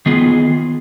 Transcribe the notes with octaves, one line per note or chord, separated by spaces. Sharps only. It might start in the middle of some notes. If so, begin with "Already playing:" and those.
D#3 B3 F4 G#4